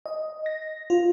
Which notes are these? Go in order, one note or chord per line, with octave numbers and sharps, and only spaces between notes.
D#5
A#6
F4